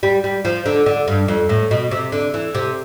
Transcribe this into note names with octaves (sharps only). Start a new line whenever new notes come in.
G3
G3
F3
D3
D3
G2
F2
A2
B2
C3
D3
E3
C3